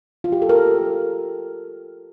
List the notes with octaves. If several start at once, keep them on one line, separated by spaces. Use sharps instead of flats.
F4
G4
A4
A#4